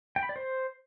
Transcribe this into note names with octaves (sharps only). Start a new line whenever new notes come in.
G5
B5
D5
C5